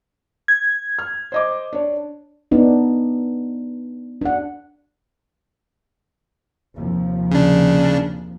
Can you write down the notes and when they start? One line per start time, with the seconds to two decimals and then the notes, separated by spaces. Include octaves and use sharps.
0.48 G#6
0.99 F6
1.32 C5 D#5 D6
1.73 D4 C#5
2.51 B3 D4 D#4
4.21 D4 F#5
6.76 D#2 C3 F3
7.31 C#3 D4